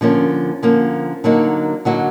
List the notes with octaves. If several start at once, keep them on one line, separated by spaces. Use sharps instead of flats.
D3 F3 A#3 C#4
D3 F3 A#3 C#4
D3 F#3 A#3 D#4 F#4
D3 F#3 A#3 D#4 F#4